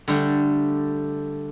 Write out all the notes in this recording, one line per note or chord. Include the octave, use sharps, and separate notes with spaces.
D3 G3 A3